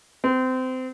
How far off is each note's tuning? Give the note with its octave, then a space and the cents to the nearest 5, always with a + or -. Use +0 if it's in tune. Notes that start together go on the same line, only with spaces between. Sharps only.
C4 -25